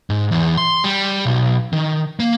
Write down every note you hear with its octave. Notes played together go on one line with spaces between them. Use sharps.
G#2
E2
C6
G3
B1
D#3
A#3